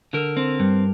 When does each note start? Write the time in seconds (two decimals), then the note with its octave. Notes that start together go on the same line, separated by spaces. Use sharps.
0.13 D3 A#4
0.37 C4
0.60 G2